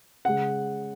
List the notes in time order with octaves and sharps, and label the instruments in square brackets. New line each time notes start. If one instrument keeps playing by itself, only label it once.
[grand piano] C#3 G#3 F#5